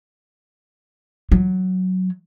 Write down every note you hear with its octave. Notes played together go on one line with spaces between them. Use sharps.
F#3